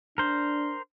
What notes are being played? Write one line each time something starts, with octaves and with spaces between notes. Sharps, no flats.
D4 A#4 C5